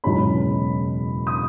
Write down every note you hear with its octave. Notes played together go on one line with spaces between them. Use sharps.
F#1 E2 B2 G#3 C#4 B5
D#6